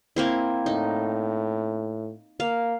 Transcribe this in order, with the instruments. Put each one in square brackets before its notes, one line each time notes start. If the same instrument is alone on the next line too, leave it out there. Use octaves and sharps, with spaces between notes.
[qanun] A#3 C4 E4
[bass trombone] A2 [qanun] D#4
[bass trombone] A#3 [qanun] F5